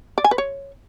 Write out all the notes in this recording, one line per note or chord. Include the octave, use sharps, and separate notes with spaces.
D5
G#5
B4
C#5